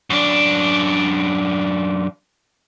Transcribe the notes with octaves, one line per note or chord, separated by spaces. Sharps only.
F#2 D4